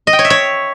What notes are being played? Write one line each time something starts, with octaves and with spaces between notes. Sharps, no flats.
D#5
G5
C#5
E5
C#5